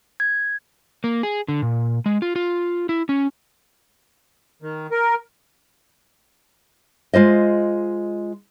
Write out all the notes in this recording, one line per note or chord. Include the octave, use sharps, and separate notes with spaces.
G#6
A#3
G#4
D3
A#2
G#3
F4
F4
E4
C#4
D#3
A#4
G#3 F4 C5 D#5